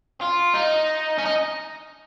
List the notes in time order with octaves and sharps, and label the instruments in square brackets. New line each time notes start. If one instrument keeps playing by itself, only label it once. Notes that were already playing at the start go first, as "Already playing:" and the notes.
[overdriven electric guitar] F4
D#4
C#4
D#4